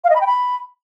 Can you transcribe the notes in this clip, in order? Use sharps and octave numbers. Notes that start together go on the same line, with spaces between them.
F5
D#5
B5
G5
B5